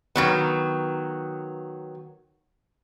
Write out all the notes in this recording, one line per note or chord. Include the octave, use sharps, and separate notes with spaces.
D#3 F#3 B3